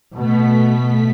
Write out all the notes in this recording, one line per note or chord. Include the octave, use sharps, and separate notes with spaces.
B2 A3 B6